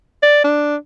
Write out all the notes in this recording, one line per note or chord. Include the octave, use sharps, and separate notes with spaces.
D5
D4